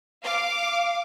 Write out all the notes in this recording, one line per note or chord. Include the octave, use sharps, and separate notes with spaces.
F5 D6